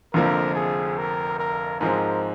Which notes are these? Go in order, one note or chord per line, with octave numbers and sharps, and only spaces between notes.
F1 F2 D3 F3 A#3 A#4
G#4
A#4
A#4
G#2 F3 G#3 C4 A#4